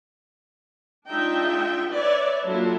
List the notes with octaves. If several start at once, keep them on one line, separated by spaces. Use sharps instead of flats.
G#3 D4 D#4 F4 E5 G5
B4 C#5 D5 E5
F#3 A#3 D4 E4 F4 A4